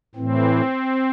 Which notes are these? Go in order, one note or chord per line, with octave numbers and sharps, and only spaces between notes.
A2 E3 C4